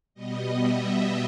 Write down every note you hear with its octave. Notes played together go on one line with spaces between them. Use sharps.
B2 G3 B3 D#5
E5